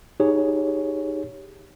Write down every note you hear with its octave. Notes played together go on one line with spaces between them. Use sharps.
D#4 G4 G#4 C#5